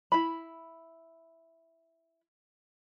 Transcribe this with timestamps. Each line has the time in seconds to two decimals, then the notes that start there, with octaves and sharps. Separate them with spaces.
0.12 E4 B5